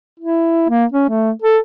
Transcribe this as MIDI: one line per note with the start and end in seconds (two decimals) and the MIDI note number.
0.20 0.65 64
0.69 0.85 58
0.92 1.08 61
1.09 1.31 57
1.42 1.58 69